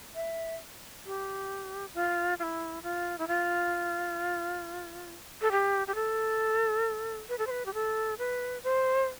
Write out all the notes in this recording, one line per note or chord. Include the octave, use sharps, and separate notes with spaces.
E5
G4
F4
F4
E4
F4
E4
F4
A4
G4
G4
A4
B4
A4
C5
B4
G4
A4
B4
C5